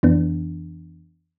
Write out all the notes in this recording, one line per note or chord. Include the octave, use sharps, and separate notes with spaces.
F2 E3 B3 D4